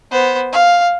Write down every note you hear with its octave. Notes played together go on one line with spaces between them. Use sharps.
B3 C5
F5